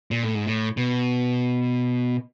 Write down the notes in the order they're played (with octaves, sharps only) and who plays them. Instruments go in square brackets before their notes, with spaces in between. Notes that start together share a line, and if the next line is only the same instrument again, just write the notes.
[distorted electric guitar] A#2
A2
G#2
A2
B2